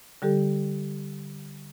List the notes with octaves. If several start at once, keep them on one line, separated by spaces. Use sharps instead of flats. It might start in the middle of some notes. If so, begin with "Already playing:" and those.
D3 G3 G4 A4